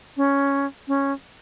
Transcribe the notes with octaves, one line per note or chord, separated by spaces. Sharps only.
C#4
C#4